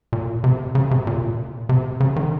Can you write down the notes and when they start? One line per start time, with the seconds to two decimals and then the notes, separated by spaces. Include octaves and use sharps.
0.13 A#2
0.44 C3
0.75 C#3
0.91 C3
1.07 A#2
1.69 C3
2.00 C#3
2.16 D#3